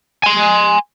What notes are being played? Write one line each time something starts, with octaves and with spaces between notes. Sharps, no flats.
G#5 C6